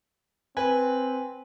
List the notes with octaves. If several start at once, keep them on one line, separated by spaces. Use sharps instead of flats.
C4 B4 G#5